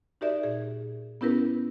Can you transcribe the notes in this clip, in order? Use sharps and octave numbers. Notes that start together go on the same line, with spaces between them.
D#4 F#4 G4 A#4 D5 E5
A#2 G#4
B3 C#4 E4 G4 A#4 B4